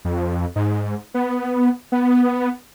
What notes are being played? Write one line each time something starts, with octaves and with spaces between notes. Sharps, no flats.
F2
G#2
B3
B3